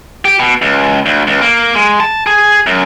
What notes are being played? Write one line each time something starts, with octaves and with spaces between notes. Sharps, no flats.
G4
B2
C#2
D2
C#2
A#3
G#3
A5
G#4
F#2